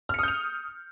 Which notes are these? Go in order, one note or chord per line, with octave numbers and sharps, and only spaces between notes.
D#6 F6 G6 C#7 F7